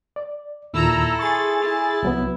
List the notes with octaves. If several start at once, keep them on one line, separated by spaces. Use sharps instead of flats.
D5
D#2 A#2 D#3 E4 A4 A#5 E6
G#4 C6 C#6 A6
E4
C2 F#3 B3